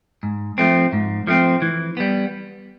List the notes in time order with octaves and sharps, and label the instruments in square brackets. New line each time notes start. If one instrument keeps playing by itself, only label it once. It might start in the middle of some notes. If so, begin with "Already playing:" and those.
[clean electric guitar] G#2
F3 A3 C4
G#2
F3 A3 C4
E3
G3 B3